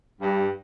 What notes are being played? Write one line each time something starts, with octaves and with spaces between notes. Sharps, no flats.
G2